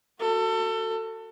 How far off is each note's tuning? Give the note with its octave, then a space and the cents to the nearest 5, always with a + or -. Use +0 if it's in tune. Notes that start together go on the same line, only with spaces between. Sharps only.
F#4 +0 A4 +25